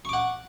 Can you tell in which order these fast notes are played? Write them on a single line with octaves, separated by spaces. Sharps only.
C#6 D6 F#5